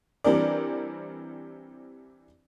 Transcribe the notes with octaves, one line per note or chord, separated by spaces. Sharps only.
E3 G3 C4 D4 A#4 D5